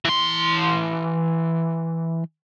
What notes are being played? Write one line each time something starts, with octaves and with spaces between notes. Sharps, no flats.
E3 C6